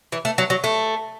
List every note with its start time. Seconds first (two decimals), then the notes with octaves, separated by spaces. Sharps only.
0.12 E3
0.25 A3
0.38 F#3
0.50 F#3
0.64 A3